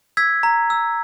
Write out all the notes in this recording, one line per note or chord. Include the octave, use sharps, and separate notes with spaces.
E6 G#6 B6
A#5
E6